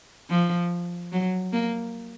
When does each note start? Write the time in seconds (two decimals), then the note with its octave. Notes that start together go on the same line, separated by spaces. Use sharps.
0.30 F3
1.12 F#3
1.53 A#3